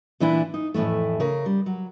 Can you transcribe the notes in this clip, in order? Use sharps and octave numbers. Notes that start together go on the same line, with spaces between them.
A#2 E3 D4 E4
D#4
F2 A2 C3 E3 A3
C#3 A#4
G3
F#3